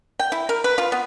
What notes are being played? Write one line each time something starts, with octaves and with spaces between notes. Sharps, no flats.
G5
E4
A#4
B4
F4
B3